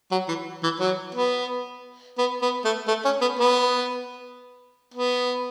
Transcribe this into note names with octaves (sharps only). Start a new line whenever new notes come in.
F#3
E3
E3
F#3
B3
B3
B3
A3
A3
C#4
B3
B3
B3